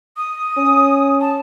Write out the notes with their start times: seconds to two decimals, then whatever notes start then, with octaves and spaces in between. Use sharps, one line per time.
0.17 D#6
0.57 C#4
1.21 A5